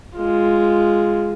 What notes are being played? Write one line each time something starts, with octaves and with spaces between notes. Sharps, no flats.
G#3 F4